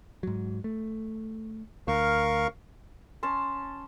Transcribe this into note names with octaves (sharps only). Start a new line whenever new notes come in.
G#2 F#3
A3
D2 A#4 F5 C#6
C#4 A5 C6